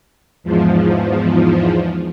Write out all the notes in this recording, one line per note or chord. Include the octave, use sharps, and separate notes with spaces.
E2 G#2 F3